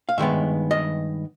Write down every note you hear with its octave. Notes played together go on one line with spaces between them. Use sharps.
F5
G2 D#3 G#3 B3 E5
D#5